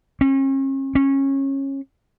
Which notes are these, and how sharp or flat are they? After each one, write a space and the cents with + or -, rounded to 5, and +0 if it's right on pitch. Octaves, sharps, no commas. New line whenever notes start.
C#4 -40
C#4 -20